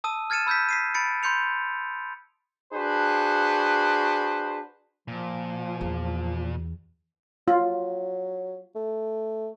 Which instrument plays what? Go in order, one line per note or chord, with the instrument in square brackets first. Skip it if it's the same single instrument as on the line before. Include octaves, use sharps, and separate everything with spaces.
[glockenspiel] A5 D#6 E6 D#7
F6 G#6 A6 C#7 D#7 E7
B5 E6 G6 G#6 B6
B6 C7 D#7
B5 A6 C#7 D7
B5 C6 G6 C#7 F7
[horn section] D4 F#4 G#4 B4 C5
[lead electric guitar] A#2 [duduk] F3
[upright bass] E2
[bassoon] F#3 [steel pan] F4
[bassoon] A3